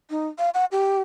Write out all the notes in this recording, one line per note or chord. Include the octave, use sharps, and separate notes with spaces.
D#4
F5
F#5
G4